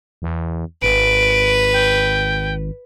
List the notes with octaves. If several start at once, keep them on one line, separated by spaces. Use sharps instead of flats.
E2
G#1 B4 D7
G5